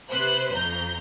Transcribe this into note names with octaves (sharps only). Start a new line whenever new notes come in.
C3 B4 C5 F#6
F2 A#5 G6